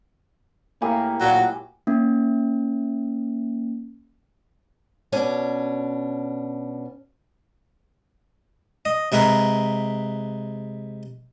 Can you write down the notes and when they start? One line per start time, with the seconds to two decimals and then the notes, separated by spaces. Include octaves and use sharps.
0.82 A2 A#3 G4 G#5
1.20 A#2 F#3
1.87 A#3 C#4
5.12 B2 C#4 D4
8.85 D#5
9.12 C3 G#3 A#4 B4